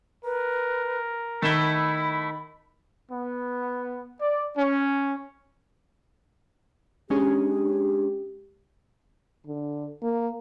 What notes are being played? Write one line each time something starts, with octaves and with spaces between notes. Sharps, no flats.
A#4 B4
D#3 A3 E4 B5 E7 G7
B3
D5
C#4
G#3 C#4 D4 G4 G#4
D3
A#3